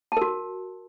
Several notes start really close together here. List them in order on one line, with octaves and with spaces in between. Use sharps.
A5 A#4 F#4